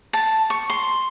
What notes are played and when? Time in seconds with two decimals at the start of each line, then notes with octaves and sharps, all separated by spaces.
0.13 A5
0.50 C#6
0.70 C6